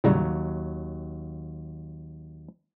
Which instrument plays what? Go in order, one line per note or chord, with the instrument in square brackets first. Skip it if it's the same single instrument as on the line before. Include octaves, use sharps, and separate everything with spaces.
[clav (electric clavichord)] D#2 F#3 A#5 [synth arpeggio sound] A2 C#3 G3